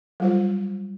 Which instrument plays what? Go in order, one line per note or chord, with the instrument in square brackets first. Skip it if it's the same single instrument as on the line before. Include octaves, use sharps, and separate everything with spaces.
[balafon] F#3 G3 F4 C5